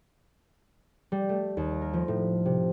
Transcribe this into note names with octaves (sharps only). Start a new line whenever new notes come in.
G3
A3
D#2
A#4
F3
A2
C3